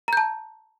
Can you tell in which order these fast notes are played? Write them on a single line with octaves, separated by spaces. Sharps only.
A#5 G6 A5